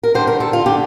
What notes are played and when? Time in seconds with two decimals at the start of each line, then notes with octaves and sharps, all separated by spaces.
0.03 A#4
0.15 D3 G3 C5
0.27 A#4
0.40 A4
0.53 F4
0.66 D3 G3 G4